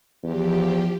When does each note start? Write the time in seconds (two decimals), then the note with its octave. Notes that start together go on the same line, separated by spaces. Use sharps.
0.23 E2 F3 G4